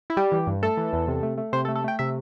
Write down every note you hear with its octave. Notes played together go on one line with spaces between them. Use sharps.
E4
G3 G4
E3
G2
A3 A4
E3
E2
C3
A3
A3
C3 C5
A4
A3
A4
A3 G5
C3 E5